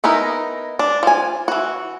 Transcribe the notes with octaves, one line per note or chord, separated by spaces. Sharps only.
B3 D#4 E4 A#4
D4
F3 G#5
E3 F#4